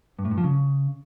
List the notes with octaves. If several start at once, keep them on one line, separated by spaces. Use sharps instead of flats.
G2
A2
G2
F3
C#3